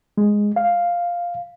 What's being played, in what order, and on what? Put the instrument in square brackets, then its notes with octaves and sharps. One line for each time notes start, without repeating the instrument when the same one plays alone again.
[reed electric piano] G#3
F5